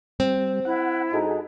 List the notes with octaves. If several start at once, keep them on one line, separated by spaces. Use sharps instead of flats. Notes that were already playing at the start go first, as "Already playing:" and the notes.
G3 C4
E4 F#5
G2 D#4 F#4 G#4 A4